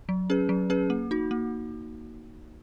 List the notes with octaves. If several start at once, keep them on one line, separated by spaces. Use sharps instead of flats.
F#3
C#4 G#4 B4
F#3
C#4 G#4 B4
A#3
D#4 F#4
A#3